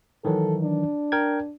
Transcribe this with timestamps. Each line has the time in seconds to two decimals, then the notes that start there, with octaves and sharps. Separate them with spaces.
0.25 D#3 E3 F#3 A4
0.63 D4
1.12 A#4 G5 G#6